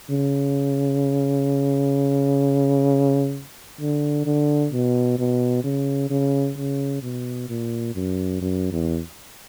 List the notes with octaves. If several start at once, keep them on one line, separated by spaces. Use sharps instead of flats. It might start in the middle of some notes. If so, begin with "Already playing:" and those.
C#3
D3
D3
B2
B2
C#3
C#3
C#3
B2
A#2
F#2
F#2
E2